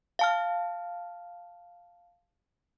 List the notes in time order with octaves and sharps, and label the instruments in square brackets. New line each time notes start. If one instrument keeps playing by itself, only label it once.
[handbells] F5 A5 F6